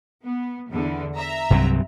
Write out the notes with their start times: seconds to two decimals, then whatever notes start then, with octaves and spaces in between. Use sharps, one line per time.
0.24 B3
0.69 E2 D3
1.15 E5 A#5
1.50 C2 G2 F#3 C4